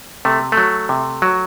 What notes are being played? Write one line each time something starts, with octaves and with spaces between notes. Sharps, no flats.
C3 A3
A3
F#3
C3
F#3